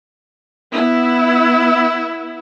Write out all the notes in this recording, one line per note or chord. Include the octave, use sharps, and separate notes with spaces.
B3 E4